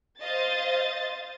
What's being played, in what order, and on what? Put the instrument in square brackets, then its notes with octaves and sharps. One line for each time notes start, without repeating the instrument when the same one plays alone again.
[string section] C5 A6 [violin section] D#5 F5